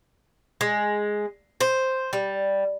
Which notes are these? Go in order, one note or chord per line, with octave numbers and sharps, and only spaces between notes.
G#3
C5
G3